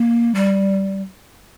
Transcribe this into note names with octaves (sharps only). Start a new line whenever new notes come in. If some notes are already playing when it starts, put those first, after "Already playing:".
Already playing: A#3
G3